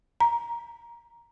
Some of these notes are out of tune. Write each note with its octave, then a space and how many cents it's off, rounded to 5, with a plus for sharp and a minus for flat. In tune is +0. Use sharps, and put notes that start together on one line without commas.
A#5 +10